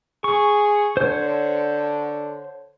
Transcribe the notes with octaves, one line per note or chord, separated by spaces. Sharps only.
G#4 C#6
D3 C5 C#5